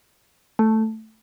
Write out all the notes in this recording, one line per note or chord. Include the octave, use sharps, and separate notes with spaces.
A3